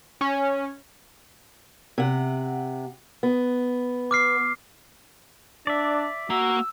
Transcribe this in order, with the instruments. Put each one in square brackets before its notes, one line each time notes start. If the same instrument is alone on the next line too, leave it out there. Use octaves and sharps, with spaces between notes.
[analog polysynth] C#4
[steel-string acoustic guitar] C3 F#5
B3
[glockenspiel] D6 F6 C7
[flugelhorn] D4 [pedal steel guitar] D5 E5
[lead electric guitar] A#3 A#5 [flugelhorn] F#4 [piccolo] E6